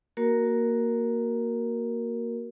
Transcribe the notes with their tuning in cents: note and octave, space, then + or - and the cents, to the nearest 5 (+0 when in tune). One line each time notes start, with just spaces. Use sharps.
A#3 +0 F#4 +0 A#4 +0